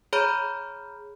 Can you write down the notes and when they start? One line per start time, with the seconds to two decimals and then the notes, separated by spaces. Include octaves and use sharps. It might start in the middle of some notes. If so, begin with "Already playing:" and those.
0.13 G#4 C#5 A#5 B5 F6 G6